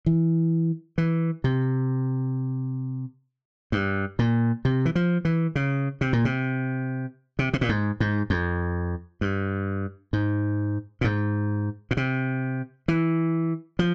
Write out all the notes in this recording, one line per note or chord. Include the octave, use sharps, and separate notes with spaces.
E3
E3
C3
G2
A#2
C3
E3
F3
E3
C#3
C3
A#2
C3
C3
C3
A#2
G#2
G#2
F2
G2
G#2
A#2
G#2
A#2
C3
E3
F3